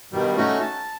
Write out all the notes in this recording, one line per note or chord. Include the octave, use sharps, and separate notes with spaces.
G2 B2 D#3 G3
A3 C#4 D#4 F#4
A5